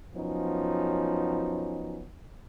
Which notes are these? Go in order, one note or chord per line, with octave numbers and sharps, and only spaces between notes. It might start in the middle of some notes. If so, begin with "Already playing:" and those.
F#2 F3 B3 C#4 D#4